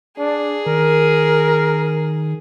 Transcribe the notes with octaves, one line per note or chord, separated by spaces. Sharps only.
D4 G#4
D#3 A#4